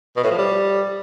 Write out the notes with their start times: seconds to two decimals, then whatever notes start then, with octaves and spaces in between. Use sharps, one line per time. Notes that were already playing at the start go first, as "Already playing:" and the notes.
0.17 B2
0.24 A2
0.31 F3
0.38 G3